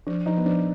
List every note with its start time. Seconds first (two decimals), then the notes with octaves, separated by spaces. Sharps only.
0.07 F3 D4
0.26 F3 D#4
0.37 B3
0.46 F3 D4